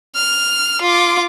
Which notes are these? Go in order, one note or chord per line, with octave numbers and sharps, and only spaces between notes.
F6
F4 D6